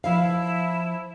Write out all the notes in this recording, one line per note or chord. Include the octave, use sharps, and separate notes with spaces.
F3 E4 F5